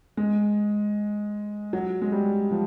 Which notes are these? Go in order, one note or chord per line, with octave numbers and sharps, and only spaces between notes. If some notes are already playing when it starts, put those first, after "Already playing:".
G#3
F#3
G#3
G3
F3